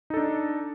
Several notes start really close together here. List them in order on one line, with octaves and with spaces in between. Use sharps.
D#4 A4 D4